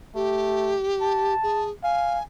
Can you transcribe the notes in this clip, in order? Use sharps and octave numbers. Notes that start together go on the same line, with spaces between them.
A3 G4
A5
G#4
F5 G#5